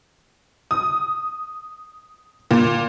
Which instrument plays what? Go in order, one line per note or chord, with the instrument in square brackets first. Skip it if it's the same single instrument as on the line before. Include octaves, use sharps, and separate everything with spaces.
[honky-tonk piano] D#6
A#2